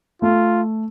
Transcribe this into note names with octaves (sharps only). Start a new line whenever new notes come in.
A3 F4